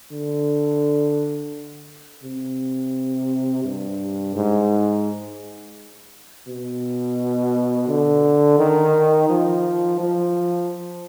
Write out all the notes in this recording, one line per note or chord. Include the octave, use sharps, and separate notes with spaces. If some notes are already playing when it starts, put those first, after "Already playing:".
D3
C3
G2
G#2
B2
D3
D#3
F3
F3